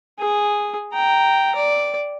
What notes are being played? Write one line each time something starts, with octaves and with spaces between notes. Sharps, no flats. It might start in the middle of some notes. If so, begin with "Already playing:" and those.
G#4
G5 A#5
D5